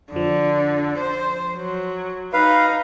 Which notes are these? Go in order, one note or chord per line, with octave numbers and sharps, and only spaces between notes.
F2 D3 F3
C5
F#3
D#4 B4 F5